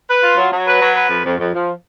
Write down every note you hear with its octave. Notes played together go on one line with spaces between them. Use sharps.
B4
F4
F#3
F#3
B4
F#3
B4
F2
F2
F2
F3